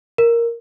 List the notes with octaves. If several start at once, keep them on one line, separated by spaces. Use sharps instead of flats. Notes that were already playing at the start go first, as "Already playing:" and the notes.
A#4